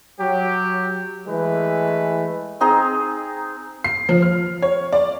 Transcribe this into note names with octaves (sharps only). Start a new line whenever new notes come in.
F#3 G4
E3 G#3 A3 B4
C4 D#4 G#4 A#5
C7
F3
F6
C#5
D5